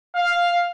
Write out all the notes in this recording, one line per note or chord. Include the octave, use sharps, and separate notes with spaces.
F5